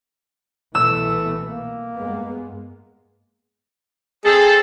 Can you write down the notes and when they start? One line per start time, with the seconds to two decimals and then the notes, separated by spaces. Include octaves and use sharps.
0.75 C2 B2 E3 A3 E6
1.45 A#3
1.97 G2 G#3 B3
4.25 C4 G#4 A4